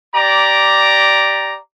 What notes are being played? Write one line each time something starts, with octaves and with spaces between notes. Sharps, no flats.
G4 D5 A#5